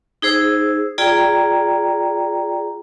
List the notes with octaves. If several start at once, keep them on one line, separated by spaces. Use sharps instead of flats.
D#4 G#4 C5 E6
F4 G#4 D5 G5 A#5